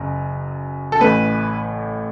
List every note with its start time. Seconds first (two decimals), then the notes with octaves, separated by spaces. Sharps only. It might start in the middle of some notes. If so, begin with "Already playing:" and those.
Already playing: F#1 F#2 F#3
0.92 A4
1.00 A1 A2 E3 A3 B4